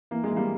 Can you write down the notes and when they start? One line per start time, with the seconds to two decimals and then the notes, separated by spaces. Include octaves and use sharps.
0.11 E3 A#3
0.24 G#3
0.31 E3
0.36 G3 A#3